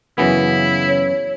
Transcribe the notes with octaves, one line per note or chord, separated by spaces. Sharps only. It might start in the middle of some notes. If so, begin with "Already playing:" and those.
F#2 C#3 E3 B3 E4
C#5